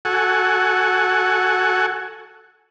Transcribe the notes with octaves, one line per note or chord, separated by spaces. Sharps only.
F#4 A4 F#5 G#5